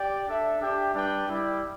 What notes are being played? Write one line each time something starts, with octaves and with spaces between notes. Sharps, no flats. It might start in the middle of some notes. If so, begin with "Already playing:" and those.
Already playing: G4 D5 G5
D4 A4 E5
D4 G4 E5 G5
G3 D4 B4 D5 G5
G3 E4 G4 D5